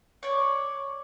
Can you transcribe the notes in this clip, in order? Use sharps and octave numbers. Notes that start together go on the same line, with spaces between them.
C#5 D5